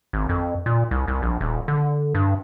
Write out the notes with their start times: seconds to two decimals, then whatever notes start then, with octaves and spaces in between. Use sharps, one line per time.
0.13 G#1
0.29 F2
0.66 A#2
0.91 C2
1.08 C2
1.22 A#1
1.41 D#1
1.68 D3
2.15 G2